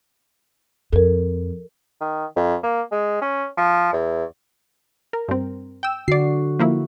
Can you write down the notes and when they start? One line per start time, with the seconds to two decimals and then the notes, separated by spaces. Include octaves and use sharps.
0.93 F2 A4 A#4
2.01 D#3
2.36 F2
2.63 A#3
2.92 G#3
3.21 C#4
3.57 F3
3.93 E2
5.13 A#4
5.28 G2 C4
5.83 G5 E6
6.08 D3 F#4 D5 C7
6.59 F3 A#3 E4